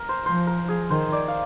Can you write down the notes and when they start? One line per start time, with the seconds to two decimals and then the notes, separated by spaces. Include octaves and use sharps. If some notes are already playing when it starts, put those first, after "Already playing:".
Already playing: A#4
0.09 C5
0.26 F3 C5
0.47 A#4
0.69 G#4
0.90 D#3 C5
1.12 D5
1.28 F5